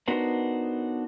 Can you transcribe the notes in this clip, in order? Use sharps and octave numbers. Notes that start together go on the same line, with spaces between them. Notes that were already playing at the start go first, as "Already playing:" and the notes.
B3 D4 D#4 F#4 A#4 C5